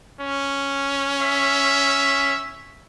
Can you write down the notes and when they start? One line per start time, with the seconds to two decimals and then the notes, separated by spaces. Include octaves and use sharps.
0.21 C#4
1.22 E5